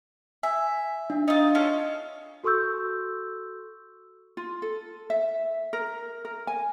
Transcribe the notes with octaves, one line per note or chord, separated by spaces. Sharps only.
E5 G#5
D4 E5
D#4 F4 D#5
C#4 F4 A4
F#4 A4 C6 C#6 E6 G6
F4
A4
E5
A#4
A#4
G#5